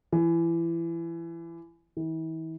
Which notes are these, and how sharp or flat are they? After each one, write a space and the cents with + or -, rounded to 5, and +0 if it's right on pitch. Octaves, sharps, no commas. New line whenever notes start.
E3 +25
E3 -40